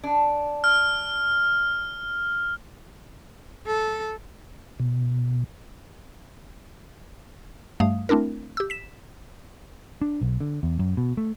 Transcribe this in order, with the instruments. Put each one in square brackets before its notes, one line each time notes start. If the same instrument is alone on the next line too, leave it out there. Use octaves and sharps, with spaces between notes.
[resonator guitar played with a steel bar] D4
[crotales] F6
[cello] A4
[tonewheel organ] B2
[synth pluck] G2 G3 A3 F5 D#6
A3 C4 D4 E4 A#4
G4 E6
B6 E7
[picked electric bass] D4
B1
D3
E2
F#2
B2
A3